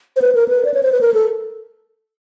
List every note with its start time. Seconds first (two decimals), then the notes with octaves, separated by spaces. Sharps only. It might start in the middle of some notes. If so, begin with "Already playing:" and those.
0.16 C5
0.22 B4
0.35 A#4
0.48 B4
0.65 D5
0.74 C#5
0.83 C5
0.92 B4
1.01 A#4
1.14 A4